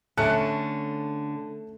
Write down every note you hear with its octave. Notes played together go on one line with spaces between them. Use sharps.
D3 A3 C#4 E5 A5 F#6 C#7